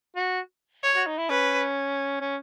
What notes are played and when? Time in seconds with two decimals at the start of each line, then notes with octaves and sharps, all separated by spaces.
0.16 F#4
0.84 C#5
0.96 F#4
1.06 D#4
1.18 E4
1.29 C#4 B4
2.21 C#4